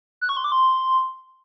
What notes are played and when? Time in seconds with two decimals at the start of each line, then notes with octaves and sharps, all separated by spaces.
0.21 F#6
0.29 C#6
0.37 C6
0.44 D6
0.52 C6